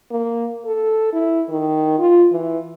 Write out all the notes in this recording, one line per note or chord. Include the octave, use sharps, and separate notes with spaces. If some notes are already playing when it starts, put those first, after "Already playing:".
A#3
A4
E4
D#3
F4
E3